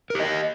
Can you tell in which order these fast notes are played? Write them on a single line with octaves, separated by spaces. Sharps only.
A#4 G4 D#5